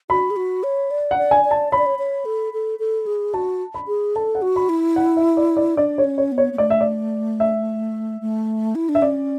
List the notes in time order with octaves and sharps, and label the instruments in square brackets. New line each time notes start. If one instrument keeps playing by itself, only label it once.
[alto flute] F#4 [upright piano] B5
[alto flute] G#4
F#4
C#5
D5
[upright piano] F#5
[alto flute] D5
[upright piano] G#5
[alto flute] D5
[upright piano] A5
[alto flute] C#5 [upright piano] B5
[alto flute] D5
C#5
C#5
A4
A4
A4
G#4
[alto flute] F#4 [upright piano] A5
[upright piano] B5
[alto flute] G#4
[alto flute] A4 [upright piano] A5
[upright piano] F#5
[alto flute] F#4
[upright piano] B5
[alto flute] E4
[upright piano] F#5
E5
D5
D5
[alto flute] D4 [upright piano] D5
[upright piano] C#5
[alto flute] C#4
[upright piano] C#5
[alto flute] B3
[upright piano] C#5
[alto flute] B3
[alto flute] A3 [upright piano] D5
[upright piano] E5
D5
E5
[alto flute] A3
E4
D4
[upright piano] E5
[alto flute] C#4 [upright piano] D5